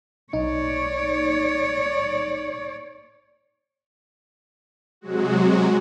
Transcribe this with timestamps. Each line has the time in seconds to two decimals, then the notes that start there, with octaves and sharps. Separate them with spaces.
0.33 B1 D#4 C#5 D5
5.01 C3 F#3 G#3 F#4